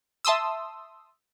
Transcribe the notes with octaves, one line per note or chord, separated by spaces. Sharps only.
E5 A5 C6 D#6 E6